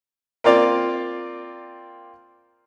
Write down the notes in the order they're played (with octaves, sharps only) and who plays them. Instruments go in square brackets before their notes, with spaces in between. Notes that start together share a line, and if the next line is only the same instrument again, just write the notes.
[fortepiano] A#3 C4 F4 D5